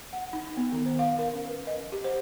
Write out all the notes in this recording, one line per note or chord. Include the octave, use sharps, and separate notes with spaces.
F#5
D#4
B3
D#3
C5
F5
A#4
C#4
B4
D#5
G4
C5